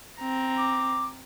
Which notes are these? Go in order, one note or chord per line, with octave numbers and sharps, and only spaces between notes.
C4 A#5
D6